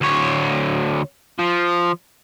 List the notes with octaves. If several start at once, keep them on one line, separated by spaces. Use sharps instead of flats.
D2 C#5
F3